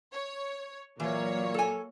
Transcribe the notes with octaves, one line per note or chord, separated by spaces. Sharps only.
C#5
A#2 E3 F#3 A#3 C#5
A4 G#5